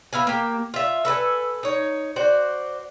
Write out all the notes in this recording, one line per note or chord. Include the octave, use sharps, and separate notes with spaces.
B3 E4 F5 G#5
A#3 G4
F4 E5
A4 B4 D#5 G#5
D#4 C#5
F#4 C5 D5